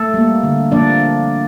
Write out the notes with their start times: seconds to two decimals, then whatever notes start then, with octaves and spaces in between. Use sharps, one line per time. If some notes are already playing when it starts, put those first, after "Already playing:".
Already playing: A3 A4
0.14 G3 A#3
0.43 D3
0.71 F3 A#3 D4 D5